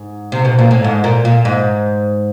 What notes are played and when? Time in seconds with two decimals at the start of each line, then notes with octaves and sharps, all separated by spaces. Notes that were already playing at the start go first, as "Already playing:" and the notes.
Already playing: G#2
0.32 C3
0.45 B2
0.59 A#2
0.71 A2
0.84 G#2
1.04 A#2
1.25 A#2
1.45 G#2